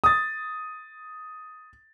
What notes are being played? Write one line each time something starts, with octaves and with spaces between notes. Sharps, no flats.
D#6 A6